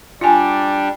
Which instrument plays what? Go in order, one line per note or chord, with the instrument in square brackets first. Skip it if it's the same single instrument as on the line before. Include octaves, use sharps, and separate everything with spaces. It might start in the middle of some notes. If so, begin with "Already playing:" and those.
[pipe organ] G3 D4 [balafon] F4 G#5